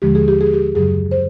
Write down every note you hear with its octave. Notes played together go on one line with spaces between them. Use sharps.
D#2 D3 F3 G#3 G4
G#4
G4
G#4
G4
F#2 C#3 F#3 G#4
C5